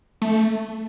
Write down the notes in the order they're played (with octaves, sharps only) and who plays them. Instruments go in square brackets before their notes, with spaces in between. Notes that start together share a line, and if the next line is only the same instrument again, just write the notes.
[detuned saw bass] A3